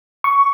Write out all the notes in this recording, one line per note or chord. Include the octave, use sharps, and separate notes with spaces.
C#6